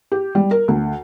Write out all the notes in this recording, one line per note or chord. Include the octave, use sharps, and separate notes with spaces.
G4
G3
A#4
D2